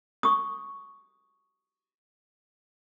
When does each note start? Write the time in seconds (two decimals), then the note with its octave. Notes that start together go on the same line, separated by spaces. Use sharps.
0.23 C#6 D#6